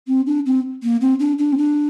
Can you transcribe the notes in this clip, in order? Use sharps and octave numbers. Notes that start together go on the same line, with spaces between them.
C4
D4
C4
A#3
C4
D4
D4
C4
D4